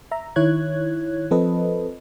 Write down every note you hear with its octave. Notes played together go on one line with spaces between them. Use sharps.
E5 A#5
D#3 E4 C#5 F#6 G#6
F3 C4 A4 B4 D#5